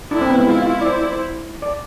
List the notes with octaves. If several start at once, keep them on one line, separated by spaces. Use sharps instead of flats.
D4 E4
C4
B3
G#3
E4 F4
F4
D5
C5
D5
C5
D5